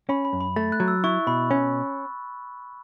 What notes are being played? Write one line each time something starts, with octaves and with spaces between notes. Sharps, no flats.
C#4 B5
B5
F#2
B5
A3 A6
F#6
F#3
E6
E4 C#6
B2 B5
C#4